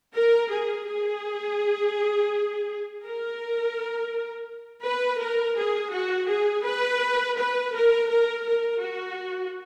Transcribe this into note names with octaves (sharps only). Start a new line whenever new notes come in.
A#4
G#4
G#4
A#4
B4
A#4
G#4
F#4
G#4
B4
B4
A#4
A#4
A#4
F#4